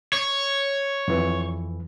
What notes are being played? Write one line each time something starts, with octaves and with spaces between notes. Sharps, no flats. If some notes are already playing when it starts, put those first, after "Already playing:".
C#5
F2 E3